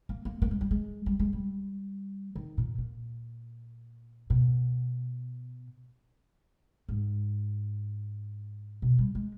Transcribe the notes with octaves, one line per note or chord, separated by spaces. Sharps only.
A#3
A#3
A#3
G#3
G3
G#3
G3
G#3
G3
D#3
A#2
A#2
B2
G#2
B2
G3
G#3